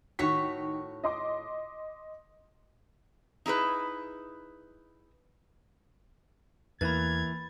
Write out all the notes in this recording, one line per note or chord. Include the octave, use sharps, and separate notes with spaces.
A2 D#3 F#4 C#5 B6
D#5 C6 D6
D#4 E4 G#4 B4
E2 E3 A#3 B5 G#6 A6